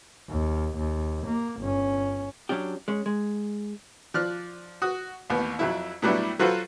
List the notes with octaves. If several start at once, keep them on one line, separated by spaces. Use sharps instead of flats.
D#2
D#2
A#3
G1 C#4
F#3 C#4 D4 G4
G#3 C#4
G#3
F3 D5 F6 F#6
F#4 D#6
A1 D#2 B3
F2 F#3 E4
A2 F#3 G3 B3 D4 E4
F#3 F4 F#4 A4 B4 C5